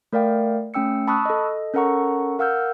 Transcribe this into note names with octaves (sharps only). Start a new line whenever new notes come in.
A3 A#4 D5 F5 G5
A3 C#4 G5 E6 C#7
A5 B5 C#6 D#6 E6 F#6
A4 D#5
C#4 A4 A#4 F#5 A#5 C#6
A#4 F5 F#5 E6 F6 G6